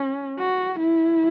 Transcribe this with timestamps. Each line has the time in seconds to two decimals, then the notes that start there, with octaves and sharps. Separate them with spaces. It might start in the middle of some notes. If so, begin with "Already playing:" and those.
Already playing: C#4
0.39 F#4
0.79 E4